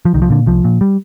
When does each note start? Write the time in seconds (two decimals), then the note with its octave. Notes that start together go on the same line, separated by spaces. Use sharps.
0.05 F3
0.14 C2 D#3
0.22 F3
0.30 A#2 D3
0.46 C2 F3
0.64 A#2
0.81 G3